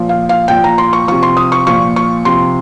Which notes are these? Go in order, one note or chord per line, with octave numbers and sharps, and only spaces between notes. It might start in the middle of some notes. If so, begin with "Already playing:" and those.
Already playing: A#2 F3
F5
F5
A#2 F3 G5
A#5
C6
C#6
C3 F3 C#6
C6
D#6
C#6
A#2 F3 C#6
C#6
C3 F3 C6